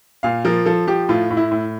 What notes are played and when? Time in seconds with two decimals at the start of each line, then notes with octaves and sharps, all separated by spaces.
0.23 A#2 F5
0.45 F3 A#4
0.65 F3 A4
0.87 F3 G4
1.09 A2 F4
1.31 A2
1.37 E4
1.52 A2